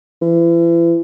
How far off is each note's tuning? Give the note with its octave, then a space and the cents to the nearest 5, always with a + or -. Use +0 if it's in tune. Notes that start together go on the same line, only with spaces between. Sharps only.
E3 +35